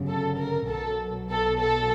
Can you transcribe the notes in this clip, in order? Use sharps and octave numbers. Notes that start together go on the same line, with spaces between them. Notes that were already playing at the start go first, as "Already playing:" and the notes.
Already playing: G1 F#2 C#3
A4
A#4
B1 B2 F#3 A4
A4
A4